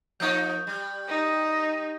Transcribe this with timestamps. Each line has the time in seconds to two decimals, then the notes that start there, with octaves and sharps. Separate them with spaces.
0.20 F3 A#3 D#4 C#6 D#6 G6
0.67 G3
1.08 D#4